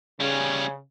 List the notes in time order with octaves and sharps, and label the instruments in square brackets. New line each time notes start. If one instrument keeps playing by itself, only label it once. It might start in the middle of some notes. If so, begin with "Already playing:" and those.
[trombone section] C#3 [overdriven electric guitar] G3 C#4